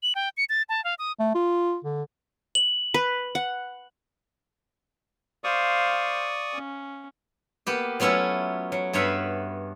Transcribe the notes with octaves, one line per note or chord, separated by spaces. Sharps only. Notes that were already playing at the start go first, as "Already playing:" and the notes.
F#7
G5
C#7
A6
A5
F5
D#6
A3
F4
D3
F#7
B4
F#5
C5 D5 F5 C#6 D#6
C#4
A#3 B3 G4
F#3 A3 B3 C#4 E4 F4
F#3
G2 B3 C#5 E5 F5 B5